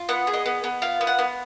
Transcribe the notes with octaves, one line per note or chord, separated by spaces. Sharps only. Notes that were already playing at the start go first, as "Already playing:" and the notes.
Already playing: F4
B3 F#5
G#4
D#5
B3
B3
F4 F5
B3
F#5
B3